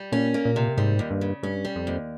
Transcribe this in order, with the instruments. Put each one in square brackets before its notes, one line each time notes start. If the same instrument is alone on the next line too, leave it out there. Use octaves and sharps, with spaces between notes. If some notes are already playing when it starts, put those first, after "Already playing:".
Already playing: [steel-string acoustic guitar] G3
[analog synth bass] A#2 [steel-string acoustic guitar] C#4
[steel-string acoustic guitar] A#3
[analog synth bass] A#2
[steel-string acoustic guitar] C3
[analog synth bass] G#2 [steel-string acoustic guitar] G3
[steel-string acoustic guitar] D#2
[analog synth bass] G2
[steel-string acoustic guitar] C#3
[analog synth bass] G2 [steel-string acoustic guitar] C#4
[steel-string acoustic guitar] G3
[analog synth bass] F2
[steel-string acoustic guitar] D#2